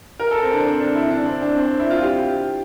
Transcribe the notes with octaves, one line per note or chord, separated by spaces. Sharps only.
A#4
A4
C4
D4
C4
D4
E4
D4
C4
D4
C4
E4
F4
G4